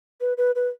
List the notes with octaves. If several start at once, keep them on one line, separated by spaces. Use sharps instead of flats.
B4
B4
B4